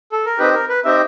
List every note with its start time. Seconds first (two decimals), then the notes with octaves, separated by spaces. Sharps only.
0.12 A4
0.26 A#4
0.38 C4 D#4 G4 B4
0.54 A#4
0.69 B4
0.85 C4 D#4 G4 E5